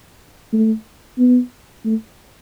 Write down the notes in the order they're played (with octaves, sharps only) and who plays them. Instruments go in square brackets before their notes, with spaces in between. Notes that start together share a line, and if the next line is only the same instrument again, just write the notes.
[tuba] A3
B3
A3